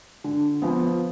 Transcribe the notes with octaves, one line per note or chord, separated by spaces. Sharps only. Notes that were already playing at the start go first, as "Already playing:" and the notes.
D3
F3 B3